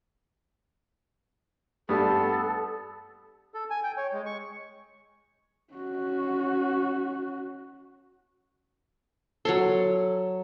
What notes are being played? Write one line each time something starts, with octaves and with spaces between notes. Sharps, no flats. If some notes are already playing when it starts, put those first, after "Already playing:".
G2 G3 A3 B3 A4
A4
G#5
G5
C#5
G#3
C#6
C#4 F#4
F#3 A4 C#5 C6